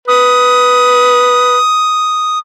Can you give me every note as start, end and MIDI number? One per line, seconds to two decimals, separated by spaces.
0.08 1.58 71
0.08 2.39 87